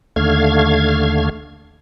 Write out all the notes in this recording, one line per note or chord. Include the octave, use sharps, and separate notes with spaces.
D#2 D3 A3 F5 G#6